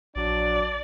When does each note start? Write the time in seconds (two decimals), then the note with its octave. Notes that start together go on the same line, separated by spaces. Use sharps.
0.16 A#1 F#3 D4 D5